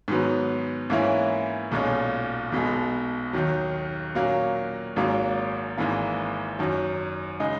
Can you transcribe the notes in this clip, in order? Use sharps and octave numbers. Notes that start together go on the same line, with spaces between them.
G#2 D#3 F#3 B3
G#2 E3 A#3 C#4 E4
B1 A#2 G#3 C#4
B1 B2 G#3
D#2 D#3 F#3
A#2 F#3 A#3 C#4
G#1 G#2 F#3 A#3
G#1 G#2 E3 A#3
F#2 D#3 F#3
C#3 G#3 D#4